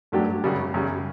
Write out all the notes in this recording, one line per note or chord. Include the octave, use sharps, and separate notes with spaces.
G2 F#3 A3 D4 G4
F#2 C#3 G3
F#2 C#3 G3